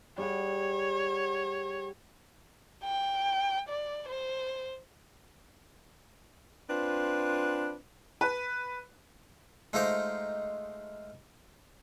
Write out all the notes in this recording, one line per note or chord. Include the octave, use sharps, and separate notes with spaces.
G3 G#4 C#5 F#5
G5
D5
C5
C4 D4 F4 B4
B4
G#3 A3 D#4 F4 A#4 C5